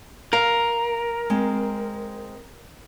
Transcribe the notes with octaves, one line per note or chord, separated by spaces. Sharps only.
A#4 F5
G#3 C4